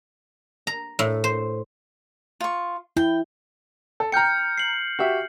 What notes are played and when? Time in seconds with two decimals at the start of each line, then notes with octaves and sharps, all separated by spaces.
0.67 A#5
0.99 A2
1.24 C5
2.40 F4 C#6
2.97 E4 G5
4.00 A4
4.12 G5 A#5 F6 G6 C#7
4.58 C7 F#7
4.99 F#4 G4 E5